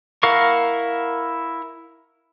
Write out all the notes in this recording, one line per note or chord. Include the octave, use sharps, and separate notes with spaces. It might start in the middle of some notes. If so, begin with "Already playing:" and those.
E4 A#4 F5 F#5 C#6